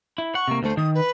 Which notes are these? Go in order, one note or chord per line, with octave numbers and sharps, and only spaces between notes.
E4
F#5 C#6
C3 A#3
D2 A3 C5
D#3 D#6
B4